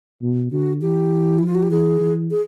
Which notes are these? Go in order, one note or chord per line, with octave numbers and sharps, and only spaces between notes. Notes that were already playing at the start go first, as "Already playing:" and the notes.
B2
D3 F#4
E3 G4
F3 E4
F4
F#4
G4
E3 G#4
E3
G#4